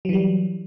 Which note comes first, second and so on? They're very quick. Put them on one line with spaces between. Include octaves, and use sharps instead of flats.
F#3 E3 G3